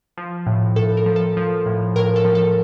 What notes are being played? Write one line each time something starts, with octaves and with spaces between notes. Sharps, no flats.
F3
A2
A2 A4
A#4
F3
A4
F3
A2
A2 A#4
A4
F3
A4